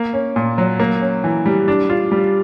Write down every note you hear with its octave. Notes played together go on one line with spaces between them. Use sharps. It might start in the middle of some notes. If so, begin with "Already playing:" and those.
Already playing: A#3
C#4
A#2
F#3
A#3
C#4
E3
G3
D4
F4
G3